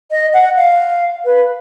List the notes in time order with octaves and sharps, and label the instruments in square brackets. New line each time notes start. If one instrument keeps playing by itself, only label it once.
[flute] D#5
F#5
F5
B4